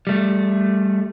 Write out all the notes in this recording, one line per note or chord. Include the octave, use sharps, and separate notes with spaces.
G3 A3